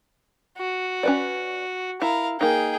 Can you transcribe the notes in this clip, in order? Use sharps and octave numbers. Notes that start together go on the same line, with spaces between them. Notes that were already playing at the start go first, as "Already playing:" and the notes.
F#4
C#4 B4 D5
E4 A#4 F5
A#3 D#4 G#4 G5